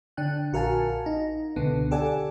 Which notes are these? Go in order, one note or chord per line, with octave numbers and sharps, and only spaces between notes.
D3 D4 G5 F#6
A#1 F#4 A#4 F5 G#5 A5
D#4
C#2 B2 D3 B3
G4 A4 D5 F#5 G#5